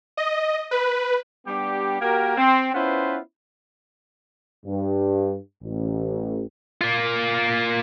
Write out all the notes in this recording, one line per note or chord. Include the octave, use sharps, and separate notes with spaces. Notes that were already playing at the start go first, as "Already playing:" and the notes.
D#5
B4
G3 B3 D4 G4
A#3 F#4 G4 A#4
C4
B3 C#4 E4 F4 B4 C5
G2
A1
A#3 F4